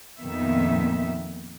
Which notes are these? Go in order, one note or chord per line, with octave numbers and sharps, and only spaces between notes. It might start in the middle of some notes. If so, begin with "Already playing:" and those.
F2 A#2 D#3 B3 E5